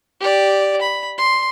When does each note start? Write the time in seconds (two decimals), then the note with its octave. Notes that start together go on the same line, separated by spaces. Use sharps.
0.20 G4 D5
0.81 B5
1.18 C6